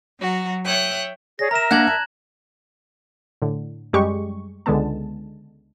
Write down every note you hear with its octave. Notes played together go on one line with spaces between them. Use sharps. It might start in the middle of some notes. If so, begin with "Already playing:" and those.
F#3 F#4 A#5
C#5 E5 G5 D#6 F#6
G#4 C#5 D5 A#6
A#4 E5 A#5 E7
A#3 D4 F#5 F#6 G#6 F#7
A5
A2 D3
F#2 G3 G#3 G4 C#6
C#2 D3 G#3 B3 A5